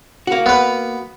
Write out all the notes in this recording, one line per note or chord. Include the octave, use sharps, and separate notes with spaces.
A#3 F#4
B3 B4